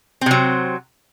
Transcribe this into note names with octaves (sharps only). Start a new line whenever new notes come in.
C3 F#3 C4